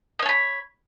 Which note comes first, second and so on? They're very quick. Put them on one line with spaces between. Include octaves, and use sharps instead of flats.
D#5 C#5 A5 B5